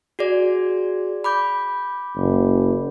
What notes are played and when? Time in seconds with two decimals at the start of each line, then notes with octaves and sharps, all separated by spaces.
0.19 F#4 G#4 D5
1.24 B5 D6 G6
2.17 F#1